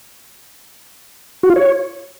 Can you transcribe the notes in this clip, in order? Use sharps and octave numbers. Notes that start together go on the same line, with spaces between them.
F#4
F4
C#5